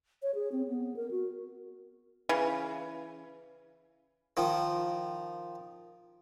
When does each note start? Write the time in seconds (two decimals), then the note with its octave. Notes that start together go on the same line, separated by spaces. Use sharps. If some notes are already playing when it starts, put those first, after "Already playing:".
0.23 C#5
0.35 G#4
0.52 C4
0.68 B3
0.96 A#4
1.11 F#4
2.29 C#3 E3
4.37 D#3 F3